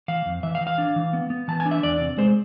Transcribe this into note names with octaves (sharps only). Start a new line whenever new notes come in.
E3 F5
F2
E3 E5
F5
E3
F5
D4
E3
B3
B3
E3 A5
G#5
D4
E5
E2 D5
C3
G#3 C5